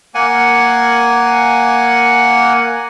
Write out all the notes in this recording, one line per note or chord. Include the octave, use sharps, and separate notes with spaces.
A#3 F#5 G#5